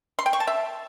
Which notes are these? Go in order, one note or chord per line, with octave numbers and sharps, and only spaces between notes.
C6
G5
C#6
A5
E5